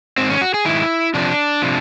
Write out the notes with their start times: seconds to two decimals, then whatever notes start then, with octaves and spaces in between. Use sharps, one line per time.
0.18 G#2 D#3 C4
0.30 C#4
0.41 F#4
0.54 G#4
0.65 G#2 D#3 E4
1.14 F2 C3 F3 D4
1.62 C3 F3